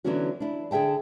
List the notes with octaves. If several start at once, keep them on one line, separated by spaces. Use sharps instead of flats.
D3 E3 F#3 B3 C#4 F#4
D4 E4
D3 G#4 E5 G5 A5